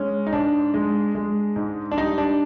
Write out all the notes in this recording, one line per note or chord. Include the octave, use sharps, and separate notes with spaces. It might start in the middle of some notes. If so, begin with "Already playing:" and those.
Already playing: G#3 C#4
D#4
G#2 D4
G#3
G#3
G#2
D4
G3 D#4
D4